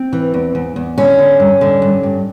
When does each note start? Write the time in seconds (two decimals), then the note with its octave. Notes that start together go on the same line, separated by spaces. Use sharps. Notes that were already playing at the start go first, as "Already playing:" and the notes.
Already playing: C4
0.13 E3
0.34 E2
0.55 E2
0.76 E2
0.98 D3 C#4
1.19 D3
1.40 G2
1.61 D3
1.82 G2
2.03 G2